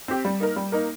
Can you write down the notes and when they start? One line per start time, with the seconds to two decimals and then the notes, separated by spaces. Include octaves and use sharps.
0.08 C4 G4
0.25 G3
0.40 A#3 D#4 A#4
0.56 G3
0.72 A#3 D#4 A#4